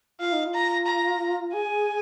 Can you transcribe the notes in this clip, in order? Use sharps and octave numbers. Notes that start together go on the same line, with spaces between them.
F4 F5
D#4
F4
A#5
A#5
G#4 G#5